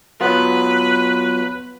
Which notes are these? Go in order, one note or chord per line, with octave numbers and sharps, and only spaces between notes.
F#3 B3 F4 B4